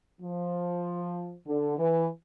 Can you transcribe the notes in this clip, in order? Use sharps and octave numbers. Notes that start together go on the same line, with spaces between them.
F3
D3
E3